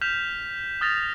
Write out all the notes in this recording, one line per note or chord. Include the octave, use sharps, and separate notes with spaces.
F6 G6 B6 E7 F7
D#6 F6 A6 A#6 F7